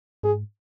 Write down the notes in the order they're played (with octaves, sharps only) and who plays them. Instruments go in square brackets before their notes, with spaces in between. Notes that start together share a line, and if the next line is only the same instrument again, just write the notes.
[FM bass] G#2 [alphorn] G#4